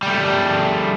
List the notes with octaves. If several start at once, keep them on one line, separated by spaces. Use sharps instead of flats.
G3 A3